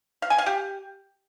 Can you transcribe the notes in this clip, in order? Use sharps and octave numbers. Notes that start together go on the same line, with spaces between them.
F5
G#5
F5
G4